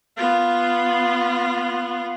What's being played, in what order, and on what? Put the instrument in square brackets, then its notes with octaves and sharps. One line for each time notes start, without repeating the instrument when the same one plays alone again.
[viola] B3 F4